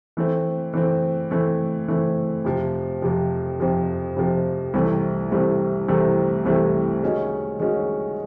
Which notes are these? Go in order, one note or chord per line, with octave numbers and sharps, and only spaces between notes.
E3 A3 C4
E3 A3 C4
E3 A3 C4
E3 A3 C4
F2 C3 F3
F2 C3 F3
F2 C3 F3
F2 C3 F3
C2 C3 E3 A3 C4
C2 C3 E3 A3 C4
C2 C3 E3 A3 C4
C2 C3 E3 A3 C4
D#3 G#3 C#4 F#4
D#3 G#3 C#4 F#4